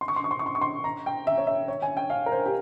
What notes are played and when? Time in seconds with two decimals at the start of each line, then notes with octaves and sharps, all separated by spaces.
0.01 C6
0.08 C#6
0.16 C6
0.24 C#6
0.31 C6
0.39 C#6
0.46 C6
0.55 C#6
0.61 C6
0.84 A#5
1.06 G5
1.27 E5
1.38 C#5
1.47 E5
1.68 C#5
1.82 G#5
1.97 G5
2.10 F5
2.26 A#4
2.32 C5
2.46 G4